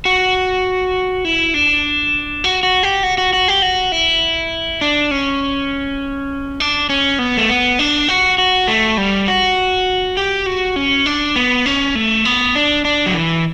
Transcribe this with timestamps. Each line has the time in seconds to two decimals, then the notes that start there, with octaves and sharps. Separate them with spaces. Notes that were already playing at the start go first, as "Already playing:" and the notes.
0.05 F#4
1.25 E4
1.54 D4
2.44 F#4
2.63 F#4
2.83 G4
3.03 F#4
3.18 F#4
3.33 F#4
3.48 G4
3.62 F#4
3.92 E4
4.81 D4
5.11 C#4
6.60 D4
6.89 C#4
7.19 B3
7.37 A3
7.49 B3
7.79 D4
8.08 F#4
8.38 F#4
8.68 A3
8.97 G3
9.28 F#4
10.17 G4
10.46 F#4
10.76 C#4
11.06 D4
11.36 B3
11.66 C#4
11.95 A3
12.25 B3
12.55 D4
12.85 D4
13.06 F#3
13.14 E3